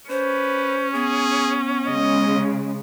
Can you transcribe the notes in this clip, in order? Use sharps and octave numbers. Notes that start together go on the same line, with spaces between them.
C#4 B4 C5
B3 G#4
C#3 G#3 D#5